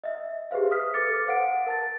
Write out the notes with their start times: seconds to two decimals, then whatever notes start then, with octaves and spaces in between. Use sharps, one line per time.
0.04 D#5 E5
0.51 G4 G#4 B4 C5 F5
0.71 D#6 F6 B6
0.94 A4 B4 D6 A6 C#7
1.27 C5 F5 F#5 D7
1.67 A#4 A5 A6